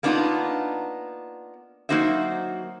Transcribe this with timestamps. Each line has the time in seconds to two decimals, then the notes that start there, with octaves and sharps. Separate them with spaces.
0.03 A#3 B3 D4 D#4 F4
1.89 F#3 A#3 D#4 F#4 C5 E5